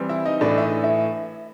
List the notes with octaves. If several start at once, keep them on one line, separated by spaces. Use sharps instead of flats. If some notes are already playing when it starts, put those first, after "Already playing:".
Already playing: E3 G3 C4
E4 E5
D#4 D#5
A2 E3 A3 D4 D5
E5
D#4 D#5
E4 E5